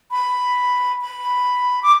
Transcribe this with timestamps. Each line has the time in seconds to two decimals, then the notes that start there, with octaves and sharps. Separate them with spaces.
0.11 B5
1.01 B5
1.83 D6